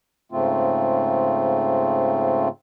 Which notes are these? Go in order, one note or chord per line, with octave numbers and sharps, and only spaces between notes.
G#2 C#3 A3 C4 F4